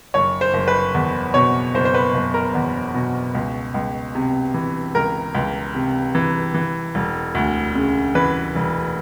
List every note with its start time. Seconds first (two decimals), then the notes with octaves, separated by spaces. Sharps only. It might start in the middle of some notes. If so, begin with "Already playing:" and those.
0.14 F#1 C#5
0.41 C5
0.54 F#1
0.68 B4
0.94 E2
1.34 B2 C#5
1.74 F#1 C5
1.85 C5
1.94 B4
2.15 F#1
2.34 A#4
2.55 E2
2.94 B2
3.35 C#2
3.74 C#2
4.15 C3
4.54 E3
4.95 C#2 A#4
5.35 C#2
5.75 C3
6.15 E3
6.54 E3
6.95 E1
7.35 D2
7.75 C#3
8.15 E3 B4
8.56 E1